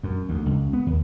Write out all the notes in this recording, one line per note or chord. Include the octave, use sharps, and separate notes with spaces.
F#2
D2
C#2
B3
D#2